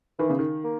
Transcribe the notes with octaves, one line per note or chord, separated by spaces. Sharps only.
D#3 E3
C#3
D#3
A#3